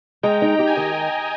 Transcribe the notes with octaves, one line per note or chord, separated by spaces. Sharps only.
G#3 G5 A#5
D#4
G4 G5
G#5
D#3 D#5 G5